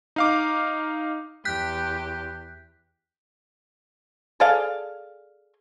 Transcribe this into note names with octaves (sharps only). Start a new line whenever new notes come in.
D#4 F5 D6
E2 G4 F#6 G6 B6
G#4 A4 D5 F5